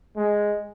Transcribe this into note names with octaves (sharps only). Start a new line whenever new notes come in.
G#3